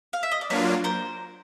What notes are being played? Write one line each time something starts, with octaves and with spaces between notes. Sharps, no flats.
F5
E5
D#5
D5
F#3 A#3 D4 F4 B4 C#5
A#4 C5